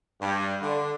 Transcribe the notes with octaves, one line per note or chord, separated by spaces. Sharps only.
G2
D3